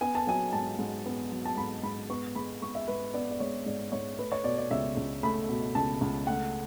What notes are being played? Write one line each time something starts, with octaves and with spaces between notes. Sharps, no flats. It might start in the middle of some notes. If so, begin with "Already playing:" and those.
B3 G#5
A5
F#3 G#5
G#2 A5
G#2
B3
F#3
A5
G#2 B5
G#2 B5
B3 C#6
G#3 B5
G#2 C#6
E5
G#2 B4
B3 D5
D5
G#3 C#5
G#2 D5
G#2 C#5
A3 B4
C#5
B2 D5
D5
C#2 E5
C#2
A3 B5
B2
C#2 A5
C#2
A3 F#5